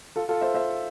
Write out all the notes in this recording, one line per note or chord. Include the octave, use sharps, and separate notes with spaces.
F4 A4
F4 A4
C5 E5
C5 E5